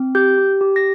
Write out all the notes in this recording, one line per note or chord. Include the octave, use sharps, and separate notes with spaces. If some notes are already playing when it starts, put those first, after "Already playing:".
Already playing: C4
G4 G6
G4
G4
A#6